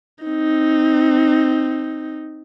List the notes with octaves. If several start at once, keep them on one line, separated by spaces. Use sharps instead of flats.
C4 D#4